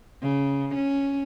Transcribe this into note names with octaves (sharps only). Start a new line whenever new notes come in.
C#3
C#4